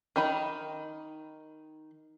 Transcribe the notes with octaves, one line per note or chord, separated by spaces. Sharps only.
D#3 D#4 B5